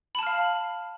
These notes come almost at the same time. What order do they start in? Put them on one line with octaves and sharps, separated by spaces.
B5 A5 F6 F5